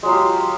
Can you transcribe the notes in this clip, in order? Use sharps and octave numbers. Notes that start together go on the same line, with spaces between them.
F#3 G#3 F4 G4